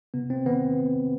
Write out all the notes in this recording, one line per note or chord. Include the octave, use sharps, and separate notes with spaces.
C3 B3
C4
D#3 B3